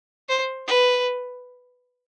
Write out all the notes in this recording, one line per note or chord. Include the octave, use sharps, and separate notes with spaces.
C5
B4